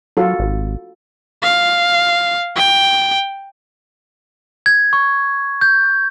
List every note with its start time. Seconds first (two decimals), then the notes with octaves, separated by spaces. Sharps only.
0.17 F#3 F4 F#4 A4
0.39 G#1
1.42 F5
2.56 G5
4.66 G#6
4.93 C#6
5.61 G6